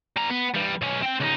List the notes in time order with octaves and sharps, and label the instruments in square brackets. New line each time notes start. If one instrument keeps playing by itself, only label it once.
[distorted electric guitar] G3 A#5
B3
E3 G3
B1 C#4
C4 G5
C#2 D#4